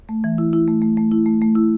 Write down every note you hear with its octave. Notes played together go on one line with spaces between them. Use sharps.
A3
E3
E4
E4
A3
A3
A3
E4
A3
A3
E4